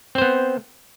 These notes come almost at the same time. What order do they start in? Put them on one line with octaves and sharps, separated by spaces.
C4 C5 B3